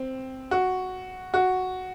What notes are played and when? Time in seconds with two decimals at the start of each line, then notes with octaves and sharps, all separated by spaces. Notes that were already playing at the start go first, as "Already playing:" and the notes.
Already playing: C4
0.51 F#4
1.34 F#4